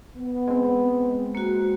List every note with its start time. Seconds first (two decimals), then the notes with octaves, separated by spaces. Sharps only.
0.17 B3
0.48 G#3 C4
1.35 A#3 F#4